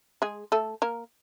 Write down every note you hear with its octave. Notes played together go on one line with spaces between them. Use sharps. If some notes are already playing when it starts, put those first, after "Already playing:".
G#3 G#4
A3 A4
A#3 A#4